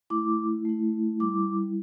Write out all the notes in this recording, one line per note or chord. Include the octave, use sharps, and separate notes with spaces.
A3 E4 D6
A3 E4
G3 E4 D6